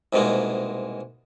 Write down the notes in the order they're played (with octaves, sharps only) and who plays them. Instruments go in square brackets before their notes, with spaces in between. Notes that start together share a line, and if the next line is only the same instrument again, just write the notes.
[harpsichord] C2 G#2 B2 G#3 A#3